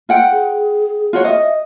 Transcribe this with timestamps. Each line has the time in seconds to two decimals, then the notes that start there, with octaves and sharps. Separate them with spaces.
0.09 F4 F#5 G5
0.32 G#4
1.13 F4 F#4 C#5
1.25 D#5 E5